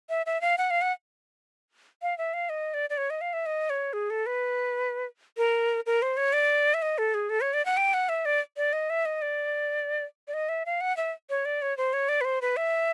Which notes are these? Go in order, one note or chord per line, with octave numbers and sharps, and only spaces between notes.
E5
E5
F5
F#5
F5
F#5
F5
E5
F5
D#5
D5
D5
C#5
D#5
F5
E5
D#5
C#5
G#4
A4
B4
A#4
A#4
C5
C#5
D5
E5
D#5
A4
G#4
A4
C#5
D5
F#5
G5
F#5
E5
D5
D5
D#5
E5
D#5
D5
D5
D#5
E5
F5
F#5
E5
C#5
D5
C#5
C5
C#5
D5
B4
C5
B4
E5